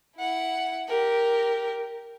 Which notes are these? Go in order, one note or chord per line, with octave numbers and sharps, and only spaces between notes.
E4 F#5
G4 A#4